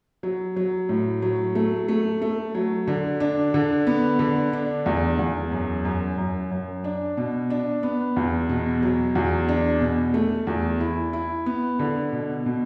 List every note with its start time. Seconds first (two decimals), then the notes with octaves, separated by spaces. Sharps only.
0.23 F#3
0.56 F#3
0.89 A2
1.22 F#3
1.55 A3
1.88 A3
2.22 A3
2.55 F#3
2.87 D3
3.20 D4
3.54 D3
3.87 B3
4.19 D3
4.53 D4
4.86 E2
5.19 E2
5.52 F#2
5.85 F#2
6.18 F#2
6.51 F#2
6.84 D4
7.17 B2
7.50 D4
7.83 B3
8.16 E2
8.49 B2
8.83 F#3
9.15 E2
9.48 D4
9.81 B2
10.14 A3
10.47 E2
10.80 E4
11.13 E4
11.46 B3
11.79 D3
12.12 B2
12.46 B2